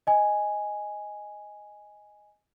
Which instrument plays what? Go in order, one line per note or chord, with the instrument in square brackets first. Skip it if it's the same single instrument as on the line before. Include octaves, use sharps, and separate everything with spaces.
[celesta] D#5 G#5